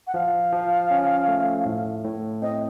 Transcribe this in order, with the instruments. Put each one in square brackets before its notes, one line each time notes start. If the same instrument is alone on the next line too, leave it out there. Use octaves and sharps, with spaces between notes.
[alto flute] F#5
[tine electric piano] F3 [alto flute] F5
[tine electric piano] F3
C#4
A3
A2
A2
[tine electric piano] C4 [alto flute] D#5